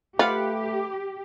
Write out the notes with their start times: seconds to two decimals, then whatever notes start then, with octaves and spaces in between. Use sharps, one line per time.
0.19 A3 F4 G4 B4 F5 F#5